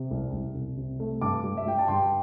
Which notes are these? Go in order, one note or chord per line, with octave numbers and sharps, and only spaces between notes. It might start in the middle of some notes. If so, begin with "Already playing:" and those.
Already playing: C3
C2
C2
C2
C3
A3
G2 A5 D6
G3
E5
G3 G5
A5
G2 G5 C6